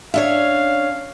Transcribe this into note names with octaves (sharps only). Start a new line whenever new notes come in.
C#4 D4 C#5 E5 F5